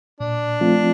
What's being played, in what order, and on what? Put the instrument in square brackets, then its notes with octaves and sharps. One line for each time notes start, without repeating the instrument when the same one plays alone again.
[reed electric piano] A#2 [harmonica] D4
[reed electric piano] F3 A3 C4 F4